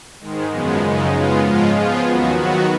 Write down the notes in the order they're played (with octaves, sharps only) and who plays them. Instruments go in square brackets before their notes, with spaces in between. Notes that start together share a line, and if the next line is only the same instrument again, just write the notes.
[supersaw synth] G#2 D#3 G#3
F#2 C#3 F3 G#3 B3
F#2 C#3 G#3 D#4
C#3 G#3 B3 F4
G#2 F3 G#3 C#4 F4
F3 B3 F4 G#4
D#2 D#3 F#3 B3 F#4
D#3 F#3 B3 F#4